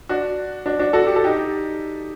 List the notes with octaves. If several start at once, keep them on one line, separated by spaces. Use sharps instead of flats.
D4 F#4
D4 F#4
D4 F#4
F#4 A4
G4
A4
D#4 G4